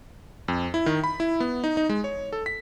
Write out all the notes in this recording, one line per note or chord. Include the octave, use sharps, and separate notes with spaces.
F2
E4
D#3
B5
E4
B3
D#4
D#4
G#3
C#5
A4
B6